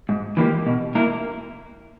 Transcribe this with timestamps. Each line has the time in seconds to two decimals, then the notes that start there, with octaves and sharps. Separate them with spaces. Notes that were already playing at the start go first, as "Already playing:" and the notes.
0.09 G#2
0.37 E3 A#3 E4 G4
0.66 B2
0.95 A#3 E4 A#4